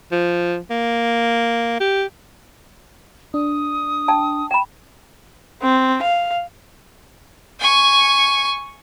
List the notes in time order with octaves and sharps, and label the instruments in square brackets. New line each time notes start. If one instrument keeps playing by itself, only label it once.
[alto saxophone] F3
A#3
G4
[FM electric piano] D4 [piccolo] D#6
[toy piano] G5 A5
[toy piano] G5 B5 [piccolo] E7
[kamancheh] C4
F5
[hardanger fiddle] G#5 C#6